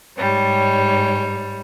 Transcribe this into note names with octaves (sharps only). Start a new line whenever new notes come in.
G#2 G3 C#5